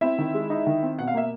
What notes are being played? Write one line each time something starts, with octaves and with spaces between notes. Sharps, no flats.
C4 E4 E5
D#3
G#3
D#4
D#3
C4
B2 F#5
F5
A#3 E5